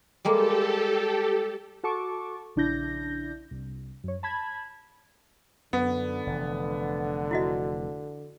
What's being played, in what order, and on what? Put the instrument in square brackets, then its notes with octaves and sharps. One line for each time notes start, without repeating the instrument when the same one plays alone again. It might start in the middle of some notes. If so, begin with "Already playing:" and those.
[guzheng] G3 G#3 A#3 [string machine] G4 A4
[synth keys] F#4 A4 A5 C#6 D6
A#1 C#3 D4 E4 G6 A#6
C2
F#2 C#5
A5 B5 G#6
[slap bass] F#2 [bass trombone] D3 [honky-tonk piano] B3
[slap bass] F1 E3
[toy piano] E4 F#4 D#5